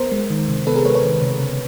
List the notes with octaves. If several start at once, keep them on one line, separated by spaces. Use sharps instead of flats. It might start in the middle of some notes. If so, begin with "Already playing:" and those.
Already playing: B3 A#4 C5
G#3
D#3
C3
B3 A4 B4
G#4 A#4
G#3 B4 C#5
B4 C#5
D#3
C3
C#3